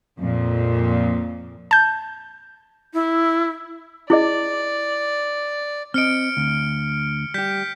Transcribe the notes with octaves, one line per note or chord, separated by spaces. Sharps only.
F2 A#2
A5 G6
E4
E4 G#4 D5 D#5
C4 D#5 F6 C#7 D7
D2
G3 G4 G6 B6